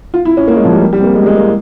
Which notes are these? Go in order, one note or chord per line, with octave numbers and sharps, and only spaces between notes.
F4
E4
C#4
A#3
G#3
F3
G3
A#3
G3
C4
A#3
G#3
G3
G#3
A#3